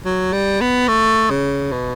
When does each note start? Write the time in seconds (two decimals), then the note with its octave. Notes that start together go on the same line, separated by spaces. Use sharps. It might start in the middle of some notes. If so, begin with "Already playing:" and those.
0.05 F#3
0.33 G3
0.61 B3
0.88 A3
1.30 C#3
1.72 B2